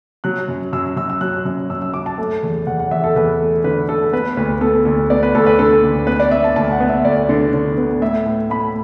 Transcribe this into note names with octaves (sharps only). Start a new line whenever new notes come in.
F#3 F#6
F#2
F#2 E6
F#2 E6
E6
F#3 F#6
F#2
F#2 E6
E6
F#2 D6
A5
A3
E2
E2 F#5
F#5
E2 E5
A4
E2 B4
A3
D3 B4
A3 A4
B3 B4
D2 B4
B3 A4
D2 A4
B3 D5
B4
D2 A4
B4
D3 A4
D2
B3 B4
D5
B3 E5
A5
D2 A5
F#5
B3
E5
D2 D5
D3
D3
B3
A2 E5
A2
A2 B5